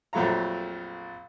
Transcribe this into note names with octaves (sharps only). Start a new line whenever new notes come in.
A#1 F2 F#3 A3 F5 A#5